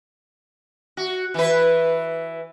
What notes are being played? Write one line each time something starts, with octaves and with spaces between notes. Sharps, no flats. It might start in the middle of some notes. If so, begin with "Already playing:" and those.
F#4
E3 B4